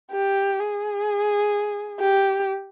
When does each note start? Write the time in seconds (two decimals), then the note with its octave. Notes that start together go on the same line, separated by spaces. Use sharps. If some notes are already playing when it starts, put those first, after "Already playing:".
0.12 G4
0.60 G#4
2.00 G4